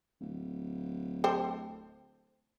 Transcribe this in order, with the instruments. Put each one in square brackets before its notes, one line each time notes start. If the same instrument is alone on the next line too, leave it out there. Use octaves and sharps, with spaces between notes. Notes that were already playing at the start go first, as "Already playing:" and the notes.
[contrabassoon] D1
[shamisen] A4 C5 G5